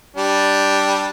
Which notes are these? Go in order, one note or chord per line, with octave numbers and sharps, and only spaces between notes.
G3 D4